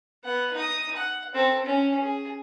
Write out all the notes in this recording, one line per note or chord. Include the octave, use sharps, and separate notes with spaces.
B3 F#5
D#4 D#6
F#5
C4 A4
C#4
G#4